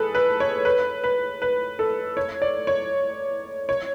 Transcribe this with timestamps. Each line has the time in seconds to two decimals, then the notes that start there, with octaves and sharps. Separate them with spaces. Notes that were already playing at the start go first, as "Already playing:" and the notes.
Already playing: G#4 A4 B4
0.15 B4
0.40 C#5
0.65 B4
1.04 B4
1.42 B4
1.79 A4
2.17 C#5
2.42 D5
2.67 C#5
3.69 C#5